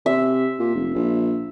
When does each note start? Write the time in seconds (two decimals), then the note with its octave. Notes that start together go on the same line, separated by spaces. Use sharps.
0.06 C3 E5
0.59 A#2
0.75 F1
0.94 A#1